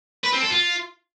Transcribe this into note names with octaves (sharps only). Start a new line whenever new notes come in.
B4
C4
A4
F4